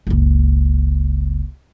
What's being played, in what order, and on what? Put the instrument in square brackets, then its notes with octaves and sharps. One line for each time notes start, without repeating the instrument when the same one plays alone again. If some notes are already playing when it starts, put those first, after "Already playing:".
[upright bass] F#1 C#2